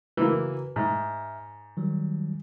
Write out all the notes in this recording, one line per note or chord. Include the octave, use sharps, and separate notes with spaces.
C#3 E3 A#3 F#4 B4
G#2 E5 F6
D#3 F#3 G3